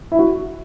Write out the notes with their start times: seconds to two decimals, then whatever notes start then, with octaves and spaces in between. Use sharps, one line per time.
0.12 E4
0.19 F#4